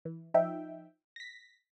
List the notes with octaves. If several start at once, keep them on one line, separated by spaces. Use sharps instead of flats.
E3
F3 D#4 E5 G5
A#6 B6